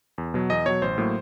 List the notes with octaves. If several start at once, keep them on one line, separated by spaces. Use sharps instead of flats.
E2
B2 F#3
E2 D#5
B2 F#3 C#5
A1 C5
A2 F#3 A#3